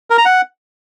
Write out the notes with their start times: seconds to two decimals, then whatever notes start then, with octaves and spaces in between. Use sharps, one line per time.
0.10 A#4
0.18 A#5
0.25 F#5